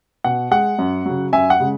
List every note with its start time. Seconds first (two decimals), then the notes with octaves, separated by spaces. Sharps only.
0.24 B2 F#5
0.51 G#3 F#5
0.79 F#2
1.06 C#3 F#3
1.33 F#2 E5 G#5
1.50 F#5
1.60 C#3 G#3